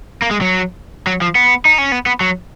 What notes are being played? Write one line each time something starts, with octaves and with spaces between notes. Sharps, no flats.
A#3
G#3
F#3
F#3
F3
B3
D#4
C#4
B3
B3
F#3